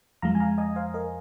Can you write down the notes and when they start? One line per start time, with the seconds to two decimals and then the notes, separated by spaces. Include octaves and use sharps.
0.22 F2 F3 G#3 F5 A#5
0.35 G#5
0.40 F5 A#5
0.58 D#5 G#5
0.76 C5 F5
0.94 A#4 D#5